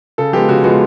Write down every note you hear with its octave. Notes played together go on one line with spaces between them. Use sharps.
C#3 A4
F3 G#3 B3 G4
C#3 F#4
F3 G#3 B3 F#4